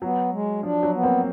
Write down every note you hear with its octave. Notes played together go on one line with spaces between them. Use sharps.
F#3 B3
G#3
F3 D4
F#3
B3
A#3 C4